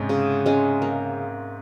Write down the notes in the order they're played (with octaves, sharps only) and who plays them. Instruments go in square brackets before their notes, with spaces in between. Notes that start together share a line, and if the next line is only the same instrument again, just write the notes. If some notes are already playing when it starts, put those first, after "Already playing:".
Already playing: [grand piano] G#2 C3 [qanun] G#3 C#4
[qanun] C#3
G#3 C#4
A#3